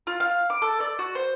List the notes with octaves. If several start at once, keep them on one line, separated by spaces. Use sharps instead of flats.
F4
F5
D6
A4
D5
F#4
C5